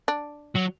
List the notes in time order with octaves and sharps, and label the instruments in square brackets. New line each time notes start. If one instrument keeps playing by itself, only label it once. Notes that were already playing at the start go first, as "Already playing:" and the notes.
[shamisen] D4
[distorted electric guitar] F#3